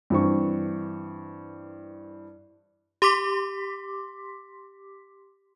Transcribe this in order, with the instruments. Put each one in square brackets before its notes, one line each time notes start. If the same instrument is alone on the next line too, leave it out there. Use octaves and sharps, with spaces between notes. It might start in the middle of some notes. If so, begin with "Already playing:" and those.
[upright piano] G2 E3 C4 C#6
[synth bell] G4 C6 D6 B6